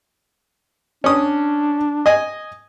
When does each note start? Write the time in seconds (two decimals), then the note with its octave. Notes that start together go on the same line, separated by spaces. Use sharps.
1.04 C#4 D4 D#6
2.06 D#5 G#5